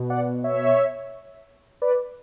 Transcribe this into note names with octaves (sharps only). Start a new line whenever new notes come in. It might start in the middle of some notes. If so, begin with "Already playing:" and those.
Already playing: B2
D5 F#5
C#5 E5
B4 D5